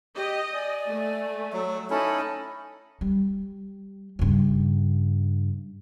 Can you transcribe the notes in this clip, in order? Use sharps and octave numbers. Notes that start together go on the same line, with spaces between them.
G4 D#5
D5 G#5
A3
F#3 E6
C#4 D#4 E4 A4 B5
G3
G2 C#3